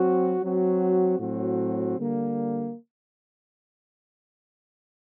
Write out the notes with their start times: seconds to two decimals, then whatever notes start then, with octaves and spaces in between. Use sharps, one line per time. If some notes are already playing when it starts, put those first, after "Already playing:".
Already playing: F#3 C4 F#4
0.42 F#3 C4 F#4
1.19 A2 F#3 C4 F#4
1.97 D3 G3 A#3